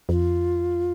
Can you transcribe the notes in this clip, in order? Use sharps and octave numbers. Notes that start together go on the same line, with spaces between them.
F2 F4